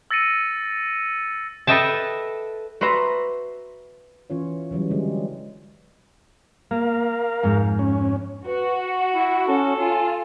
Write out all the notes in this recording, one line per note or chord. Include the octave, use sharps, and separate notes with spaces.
E6 A6 A#6 C#7 D#7
A4 B4 D#5 E5 G5 A5
F#4 B4 C5 E5 A#5
E3 C#4 F4 C#5
C#3 E3 F#3 G3
D3 G3 G#3
A#3 A#4 F5
F2 G#2
C#4
F#4 B4
F#5
E4
C#4 A4
F4 G#5